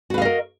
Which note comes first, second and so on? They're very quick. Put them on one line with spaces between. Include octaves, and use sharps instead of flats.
F#4 B4 F5 D#5 A#4